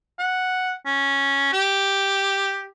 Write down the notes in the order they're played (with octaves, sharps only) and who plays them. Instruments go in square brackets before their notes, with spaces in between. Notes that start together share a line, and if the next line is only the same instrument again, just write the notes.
[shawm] F#5
C#4
G4